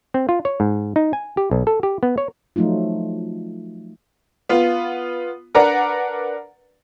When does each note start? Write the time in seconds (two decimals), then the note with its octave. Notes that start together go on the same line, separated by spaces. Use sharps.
0.14 C4
0.29 F4
0.45 C#5
0.60 G#2
0.96 D#4
1.13 G#5
1.37 G4
1.51 B1
1.67 A4
1.83 G4
2.03 B3
2.18 C#5
2.56 F3 F#3 A3 D#4 F4
4.49 B3 F4
5.55 D4 A#4 B4 D5 F#5 A#5